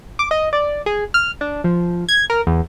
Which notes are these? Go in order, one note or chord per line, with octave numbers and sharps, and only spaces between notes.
D6
D#5
D5
G#4
F6
D4
F3
G#6
A#4
E2